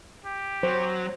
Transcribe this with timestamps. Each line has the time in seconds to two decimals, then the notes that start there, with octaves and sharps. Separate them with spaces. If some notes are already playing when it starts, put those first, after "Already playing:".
0.25 G4
0.63 F#3 C5